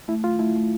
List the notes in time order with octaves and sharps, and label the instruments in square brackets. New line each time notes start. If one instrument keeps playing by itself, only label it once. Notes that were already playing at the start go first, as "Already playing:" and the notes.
[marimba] A3 [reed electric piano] E4
[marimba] A3 [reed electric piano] F4
[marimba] A3 [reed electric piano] E4
[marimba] A3